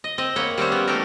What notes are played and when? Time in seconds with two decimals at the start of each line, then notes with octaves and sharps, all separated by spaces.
0.04 D#5
0.18 C4 D#5
0.36 A#3 C#5 F#5 B5
0.57 G3 C4 C#4 C5
0.72 B3
0.87 E3 A3 G4 A#4